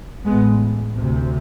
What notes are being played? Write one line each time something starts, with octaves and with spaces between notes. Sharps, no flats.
A1 A2 G#3 B3
D2 C3